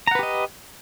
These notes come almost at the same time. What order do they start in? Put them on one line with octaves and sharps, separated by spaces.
A#5 F#5 B4 G4 D#5